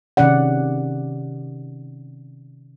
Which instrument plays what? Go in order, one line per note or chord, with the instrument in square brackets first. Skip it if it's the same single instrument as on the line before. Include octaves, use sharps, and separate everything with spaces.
[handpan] C3 D#3 C#4 D5 F#5